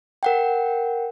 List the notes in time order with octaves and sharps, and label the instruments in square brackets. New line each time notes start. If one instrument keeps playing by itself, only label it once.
[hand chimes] A#4 F#5 G5